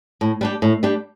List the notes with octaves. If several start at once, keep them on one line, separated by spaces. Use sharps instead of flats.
A2
G3 D4 G4
A2
G3 D4 G4